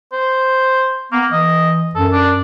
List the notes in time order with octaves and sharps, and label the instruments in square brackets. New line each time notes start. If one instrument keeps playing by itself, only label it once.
[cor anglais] C5
[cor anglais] A#3 [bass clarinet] B3
[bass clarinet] E3 [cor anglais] D#5
[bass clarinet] F#2 [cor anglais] A4
[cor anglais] D4